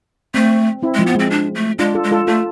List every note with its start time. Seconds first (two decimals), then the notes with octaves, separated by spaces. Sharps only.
0.34 A3 C4
0.83 C4 E4
0.94 G#3
0.99 F3
1.07 B3
1.15 G#3
1.19 C4
1.31 D4
1.55 A3
1.79 G#3 D4 F4
1.95 F4 A4
2.04 G#3
2.11 F4 A4
2.27 A3 F4 A4